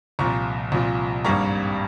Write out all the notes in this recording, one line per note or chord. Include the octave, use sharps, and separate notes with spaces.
C2 A#2 F3 A#5 C#6
C2 A#2 F3
G#1 G2 G3 A#3 A#5 C#6